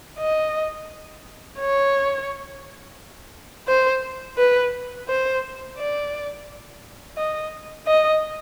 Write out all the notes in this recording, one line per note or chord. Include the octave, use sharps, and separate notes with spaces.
D#5
C#5
C5
B4
C5
D5
D#5
D#5